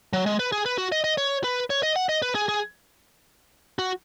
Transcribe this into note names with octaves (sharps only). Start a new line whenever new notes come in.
F#3
G#3
B4
G#4
B4
F#4
D#5
D#5
C#5
B4
C#5
D#5
F#5
D#5
B4
G#4
G#4
F#4